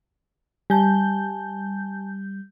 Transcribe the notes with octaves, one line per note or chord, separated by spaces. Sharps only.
G3 G#5 A5 G6